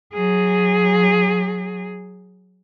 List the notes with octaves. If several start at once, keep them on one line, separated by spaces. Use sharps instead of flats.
F#3 G#4